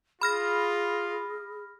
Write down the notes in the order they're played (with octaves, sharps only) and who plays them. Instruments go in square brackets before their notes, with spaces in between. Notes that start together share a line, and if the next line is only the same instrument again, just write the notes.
[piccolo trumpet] F4 [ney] G#4 [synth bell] B5 F6 A#6